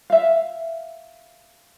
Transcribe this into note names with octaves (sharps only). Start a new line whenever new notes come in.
E5 F5